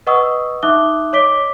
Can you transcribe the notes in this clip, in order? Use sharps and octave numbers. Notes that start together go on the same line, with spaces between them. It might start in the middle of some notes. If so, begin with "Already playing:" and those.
B4 D#5 F#5 C#6 D#6 E6
D#4 E5 D6 D#6 F#6 G7
C#5 D#5 D6 B6 D7 G7